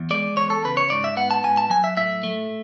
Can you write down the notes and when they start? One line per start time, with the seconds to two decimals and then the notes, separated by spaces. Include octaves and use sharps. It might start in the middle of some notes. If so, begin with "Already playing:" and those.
Already playing: E2
0.10 G#3 D5
0.37 E2 C#5
0.50 A4
0.65 C#3 B4
0.77 C#5
0.90 G#2 D5
1.04 E5
1.17 B3 F#5
1.31 A5
1.44 G#2 G#5
1.57 A5
1.70 F#3 G#5
1.84 E5
1.97 A2 E5
2.23 A3